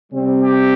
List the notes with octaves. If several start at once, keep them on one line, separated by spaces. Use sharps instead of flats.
C3 G3 C4
G4